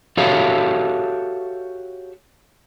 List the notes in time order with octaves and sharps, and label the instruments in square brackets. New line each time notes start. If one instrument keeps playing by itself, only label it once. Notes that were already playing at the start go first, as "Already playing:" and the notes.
[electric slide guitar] F#4 G4 A4 C#5 E5 F5